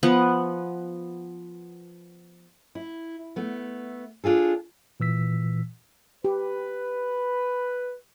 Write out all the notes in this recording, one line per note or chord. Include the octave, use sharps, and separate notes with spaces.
F3 B3 F#5
E4
A3 B3
D4 F4 G#4 A4
A#2 E3 E6 B6
G4 B4